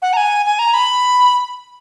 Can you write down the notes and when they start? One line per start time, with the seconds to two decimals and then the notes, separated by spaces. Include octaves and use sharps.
0.02 F#5
0.13 A#5
0.17 G#5
0.46 G#5
0.59 A#5
0.74 B5